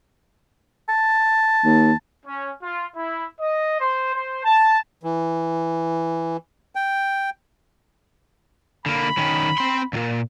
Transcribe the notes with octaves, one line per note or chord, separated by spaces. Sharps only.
A5
D#2
C#4
F4
E4
D#5
C5
C5
A5
E3
G5
D3 A#3 B5
D#3 C#4
C4 C6
C#2 A#2